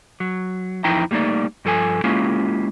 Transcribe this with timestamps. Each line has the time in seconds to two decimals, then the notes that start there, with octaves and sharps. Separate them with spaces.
0.20 F#3
0.84 E2 F3 D#4 E4 G5 A#5
1.11 G3 A3 A#3 D#4 D5
1.65 G2 F3 A4 B4 G#5
2.04 G#3 A#3 C#4 E4 F4 G4